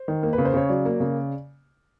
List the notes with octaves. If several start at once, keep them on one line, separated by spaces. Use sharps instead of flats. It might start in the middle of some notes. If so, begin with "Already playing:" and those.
Already playing: C5
D#3
A#3
B4
C#3
C5
C#3 C#5
F#3 D5
A#3
C#3